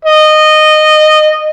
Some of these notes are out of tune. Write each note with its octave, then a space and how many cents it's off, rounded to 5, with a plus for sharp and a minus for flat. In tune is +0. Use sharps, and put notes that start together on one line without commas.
D#5 -15